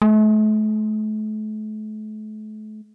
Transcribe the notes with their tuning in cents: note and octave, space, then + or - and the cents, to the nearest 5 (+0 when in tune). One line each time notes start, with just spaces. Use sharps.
A3 -40